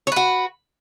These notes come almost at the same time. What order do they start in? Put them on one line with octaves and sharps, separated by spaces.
C#5 B4 F#4